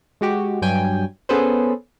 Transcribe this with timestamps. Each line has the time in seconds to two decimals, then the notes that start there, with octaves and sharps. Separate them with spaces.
0.21 G#3 F#4 G4
0.62 G2 F#3 G5 G#5
1.29 B3 C#4 G#4 A4 B4 C5